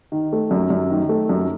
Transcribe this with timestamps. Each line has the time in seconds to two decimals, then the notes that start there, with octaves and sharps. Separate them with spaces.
0.12 D#3
0.32 A3
0.51 F#2
0.70 F#2
0.90 D#3
1.09 A3
1.29 F#2